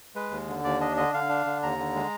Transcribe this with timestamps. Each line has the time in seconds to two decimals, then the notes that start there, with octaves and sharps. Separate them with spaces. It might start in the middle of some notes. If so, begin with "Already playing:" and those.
0.15 G#3 B4
0.31 D#2
0.48 D3
0.64 D#2 D5
0.80 D4 D#5
0.97 D3 D#5
1.14 D3 F5
1.29 D4
1.46 D3
1.63 D#2 A#5
1.79 D3
1.95 G#3